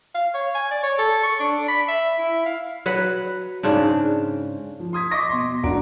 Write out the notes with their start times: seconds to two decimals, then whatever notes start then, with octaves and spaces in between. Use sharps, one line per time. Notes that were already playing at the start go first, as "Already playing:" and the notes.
0.15 F5
0.35 C#5
0.55 G#5
0.71 D5
0.83 C#5
0.99 A4
1.23 C#6
1.40 D4
1.68 B5
1.89 E5
2.19 E4
2.46 F5
2.86 F#3 B4 F#5
3.63 G#2 C#3 D4
4.80 F3
4.93 C6 D#6 G#6 B6
5.11 D#5 C#6 D6 A#6 B6
5.29 B2 C6
5.63 F#1 D4 F#4 A#5 D7